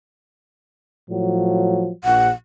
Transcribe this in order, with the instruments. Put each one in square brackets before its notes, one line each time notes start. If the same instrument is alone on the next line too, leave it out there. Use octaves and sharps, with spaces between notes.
[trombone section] A2 F3 F#3
[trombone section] A#1 [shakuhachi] F#5